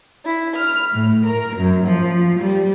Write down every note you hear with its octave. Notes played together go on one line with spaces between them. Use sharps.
E4
F6
A2
A#4
F#2
F3
G3